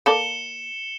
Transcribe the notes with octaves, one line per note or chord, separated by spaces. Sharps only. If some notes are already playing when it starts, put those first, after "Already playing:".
A#3 A4 D5 C#7 E7 G7